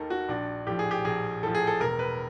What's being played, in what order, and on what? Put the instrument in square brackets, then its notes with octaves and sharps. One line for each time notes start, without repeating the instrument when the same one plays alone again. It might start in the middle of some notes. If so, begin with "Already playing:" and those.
Already playing: [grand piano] D#2 D#3 A4 A#4
F#4
A#1 D4
A2 F3 G4
G#4
G4
A#1 G#4
A2 F3 A4
G#4
A4
E1 A#4
B4